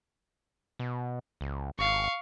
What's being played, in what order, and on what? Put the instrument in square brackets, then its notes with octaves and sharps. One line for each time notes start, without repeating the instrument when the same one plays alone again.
[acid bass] B2
C#2
[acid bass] G#1 [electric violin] F5 C#6